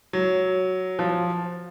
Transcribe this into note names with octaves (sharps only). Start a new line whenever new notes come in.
F#3
F3